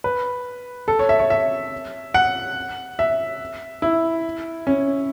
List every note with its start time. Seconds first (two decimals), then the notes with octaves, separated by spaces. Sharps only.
0.04 B4
0.88 A4
0.99 C#5
1.09 E5
1.19 C#5
1.30 E5
2.14 F#5
2.99 E5
3.82 E4
4.67 C#4